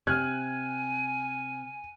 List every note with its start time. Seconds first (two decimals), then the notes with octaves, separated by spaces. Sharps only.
0.07 C3 G#5 F6 F#6 G#6